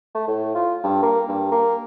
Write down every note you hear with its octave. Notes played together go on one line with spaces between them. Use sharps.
A3
A2
F4
G2
A#3
G2
A#3